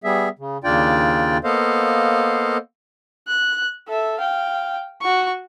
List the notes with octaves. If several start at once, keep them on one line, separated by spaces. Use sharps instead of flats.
G3 B3 G#4 E5
C#3
D#2 C#3 D4 F4 D5 G5
A#3 B3 A4 C5 D#5 F5
F#6
A4 E5
F5 G5
F#4 C#6